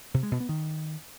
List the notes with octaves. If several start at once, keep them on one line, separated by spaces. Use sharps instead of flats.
C3
G#3
B2
B3
D#3